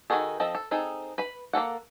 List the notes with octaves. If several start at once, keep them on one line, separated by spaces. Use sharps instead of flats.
D#3 E3 F#4 G#4 A4
F3 C4 A4 D#5
A4
C4 D#4 G#4 A4
B4 B5
A#3 C#4 A4 F#5